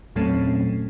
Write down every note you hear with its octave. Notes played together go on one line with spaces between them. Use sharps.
E2 A#2 F#3 A3 C4 C#4